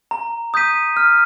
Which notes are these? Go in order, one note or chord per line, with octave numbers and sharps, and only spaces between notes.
A#5
D#6 G6 B6 D#7
F6